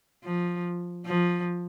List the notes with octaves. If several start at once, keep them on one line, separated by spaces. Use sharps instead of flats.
F3
F3